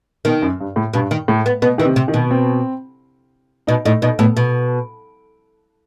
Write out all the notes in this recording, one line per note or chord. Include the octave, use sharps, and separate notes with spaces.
B2 D#3
F#2
G2
A2
G2 B2
D#3
A2
B3
B2 B3
D#3 E3
C3
C3
D#3
B2
C4
B2 D#4
A2 D#4
B2 D#4
A2 B3
B2